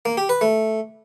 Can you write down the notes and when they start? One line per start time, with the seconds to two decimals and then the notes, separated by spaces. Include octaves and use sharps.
0.05 A#3
0.17 G4
0.29 B4
0.41 A3